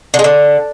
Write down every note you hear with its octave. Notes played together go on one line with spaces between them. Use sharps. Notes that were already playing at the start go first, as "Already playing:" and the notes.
D3
G#3
D3